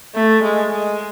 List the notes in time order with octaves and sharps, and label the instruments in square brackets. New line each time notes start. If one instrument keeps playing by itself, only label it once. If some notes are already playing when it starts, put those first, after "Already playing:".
[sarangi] A3
G#3
G#3